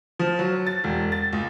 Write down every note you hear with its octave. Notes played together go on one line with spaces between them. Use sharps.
F3
F#3
A6
E1
A6
C#2